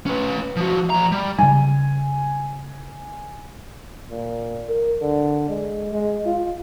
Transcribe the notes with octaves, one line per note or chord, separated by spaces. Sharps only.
C#4 B4
F3 F#4
F3 A#5
G3
C#3 G3 G#5
A#2
A#4
D3
G#3
G#3
F4